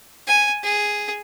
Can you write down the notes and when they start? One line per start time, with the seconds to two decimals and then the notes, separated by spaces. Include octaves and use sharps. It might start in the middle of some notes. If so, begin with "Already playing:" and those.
0.27 G#5
0.63 G#4